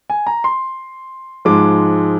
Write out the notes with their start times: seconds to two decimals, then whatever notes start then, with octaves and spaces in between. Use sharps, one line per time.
0.10 G#5
0.27 A#5
0.44 C6
1.45 G#2 F3 G#3 D6